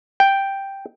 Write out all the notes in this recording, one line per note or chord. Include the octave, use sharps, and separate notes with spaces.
G5